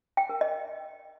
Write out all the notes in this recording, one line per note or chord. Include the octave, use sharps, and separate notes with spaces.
G5
A#4
D#5